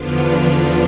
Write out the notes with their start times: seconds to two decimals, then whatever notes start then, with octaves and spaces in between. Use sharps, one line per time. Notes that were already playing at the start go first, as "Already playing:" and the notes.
Already playing: E2 D3 F3 B3 D4 F4
0.42 D4